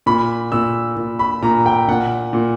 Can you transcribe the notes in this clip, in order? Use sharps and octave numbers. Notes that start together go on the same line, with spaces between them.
A#2 B5
A#2 E6
A#2
B5
A#2 A#5
G5
A#2 F#5
A#2